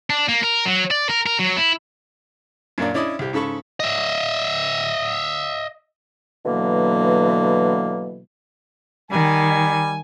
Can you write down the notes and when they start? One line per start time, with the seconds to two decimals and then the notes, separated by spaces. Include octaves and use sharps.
0.10 D4
0.29 A#3
0.43 A#4
0.66 F#3
0.91 D5
1.09 A#4
1.26 A#4
1.39 F#3
1.57 E4
2.78 F#2 A#2 A#3 D4
2.94 C#4 D4 E4 D5 D#5
3.19 C2 G4
3.33 G#2 C#3 A4 B5 C#6
3.80 D#5 E5
6.46 B2 D3 E3 F#3 A#3
9.11 D#3 G3 G#5